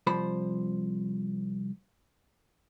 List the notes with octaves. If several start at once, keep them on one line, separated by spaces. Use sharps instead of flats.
C2 F3 C5 B5